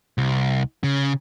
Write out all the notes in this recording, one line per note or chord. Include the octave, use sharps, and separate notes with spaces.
C2
C#3